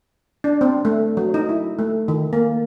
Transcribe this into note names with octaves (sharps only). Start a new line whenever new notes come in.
D4
C4
A3
F#3
D#4
E4
A3
D#3
A#3